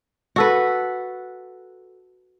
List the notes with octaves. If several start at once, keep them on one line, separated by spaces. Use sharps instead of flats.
F#4 A4 B4